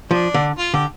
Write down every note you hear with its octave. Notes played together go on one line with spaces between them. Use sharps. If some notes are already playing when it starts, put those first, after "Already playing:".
F3 D4
D3
F4
D3 G4